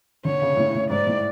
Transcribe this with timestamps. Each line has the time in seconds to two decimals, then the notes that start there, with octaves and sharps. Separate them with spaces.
0.25 D3 C#5
0.42 C#3
0.57 A2
0.74 A2
0.90 G#2 D5
1.07 A2